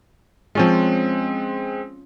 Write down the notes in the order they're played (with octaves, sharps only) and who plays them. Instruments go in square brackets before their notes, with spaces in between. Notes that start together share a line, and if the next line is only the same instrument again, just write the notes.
[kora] F3 C#4 F4 [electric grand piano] G#3 C4